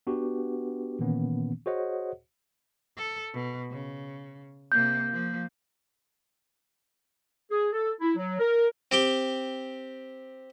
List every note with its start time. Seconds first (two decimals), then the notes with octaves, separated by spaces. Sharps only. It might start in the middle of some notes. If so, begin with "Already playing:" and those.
0.07 B3 D4 F#4 G4 B4
0.99 A#2 D#3 E3 A#3 B3 C#4
1.66 F#4 G#4 C5 C#5 D#5 F#5
2.97 A4
3.34 B2
3.70 C#3
4.72 C3 A#3 G6
5.11 F3 A#3
7.51 G#4
7.72 A4
8.01 E4
8.16 F#3
8.39 A#4
8.91 C4 G4 G5